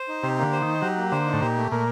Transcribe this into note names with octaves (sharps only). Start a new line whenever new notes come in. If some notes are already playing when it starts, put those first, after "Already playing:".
Already playing: C5
D#4
C3 G4
D3 A#3
C5
D#3
D#4
F#3 G4
A#3
D3 C5
D#4
A2
A#2 G4
A3
A#2 A#4